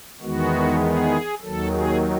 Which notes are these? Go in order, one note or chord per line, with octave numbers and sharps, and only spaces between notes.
E2 D#3 G#3 B3 F#4
G#4
D#2 D#3 F#3 A4
G#4